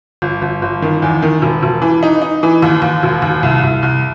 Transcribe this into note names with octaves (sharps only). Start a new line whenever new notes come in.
G1
G1
G1
D#3
E2
D#3
E1
E1
E3
D#4
D#4
E3
D#2
D#2
E1
D#2
C2
C2
C2